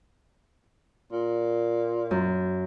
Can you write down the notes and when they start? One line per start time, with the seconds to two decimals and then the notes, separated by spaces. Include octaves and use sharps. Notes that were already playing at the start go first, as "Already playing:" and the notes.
1.12 A#2
2.11 F#2